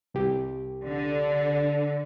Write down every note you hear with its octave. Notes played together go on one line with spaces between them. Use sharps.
C2 G4
D3